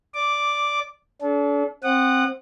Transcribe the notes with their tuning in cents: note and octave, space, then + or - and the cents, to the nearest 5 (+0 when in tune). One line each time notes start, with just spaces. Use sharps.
D5 -10 D6 +0
D4 -40 A4 -35
C4 +10 F#5 +0 D#6 -30